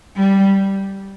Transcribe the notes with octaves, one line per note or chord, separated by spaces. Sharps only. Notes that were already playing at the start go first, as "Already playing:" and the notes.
G3